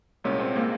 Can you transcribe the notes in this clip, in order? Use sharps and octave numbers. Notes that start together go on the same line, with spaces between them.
C2 A#2 G#3 C#4
C4
A#2 G#3 A#3